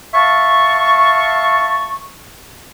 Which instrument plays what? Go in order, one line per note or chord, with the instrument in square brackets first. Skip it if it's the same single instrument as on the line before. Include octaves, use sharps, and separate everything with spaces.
[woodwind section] E5 F5 A5 C#6